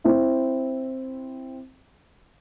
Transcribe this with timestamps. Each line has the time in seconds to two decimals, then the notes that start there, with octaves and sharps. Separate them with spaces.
0.04 C4 E4